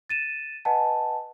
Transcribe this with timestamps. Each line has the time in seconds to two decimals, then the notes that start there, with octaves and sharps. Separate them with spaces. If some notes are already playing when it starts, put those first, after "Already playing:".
0.10 A6 D#7 E7
0.65 B4 D#5 F#5 G#5 A5